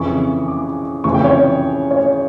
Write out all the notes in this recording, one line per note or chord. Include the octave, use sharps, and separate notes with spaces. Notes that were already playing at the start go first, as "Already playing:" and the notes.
Already playing: F2 C#3 E3 C#6
D6
F2 C#3 E3 C#6
G5
C#5
C#5